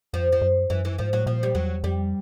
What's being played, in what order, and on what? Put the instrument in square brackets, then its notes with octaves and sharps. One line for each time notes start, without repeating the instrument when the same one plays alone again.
[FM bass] F2 [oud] F3
[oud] F3
[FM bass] F#2
[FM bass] F#2 [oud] E3
[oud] E3
[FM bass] G#2 [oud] F3
[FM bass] A2 [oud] F#3
[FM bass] A#2 [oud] F3
[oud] G3
[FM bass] E2 [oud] F#3
[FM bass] F2 [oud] G3